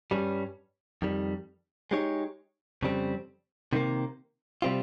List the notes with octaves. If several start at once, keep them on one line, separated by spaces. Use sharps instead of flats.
G2 G3 C#4
F2 D#3 G3
G#3 D#4 G4 C#5
F2 C#3 G3 C4
C3 D#3 G3 A#3
C3 G3 C4 F4